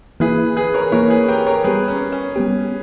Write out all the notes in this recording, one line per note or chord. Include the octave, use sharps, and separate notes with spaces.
E3 A#3 E4 G#4 B4
G#4 B4
A#4 C#5
E3 A#3 E4 A#4 C#5
G#4 B4
G4 A#4
A#4 C#5
G3 B3 G4 G#4 B4
C#4
C#4
G3 B3 G4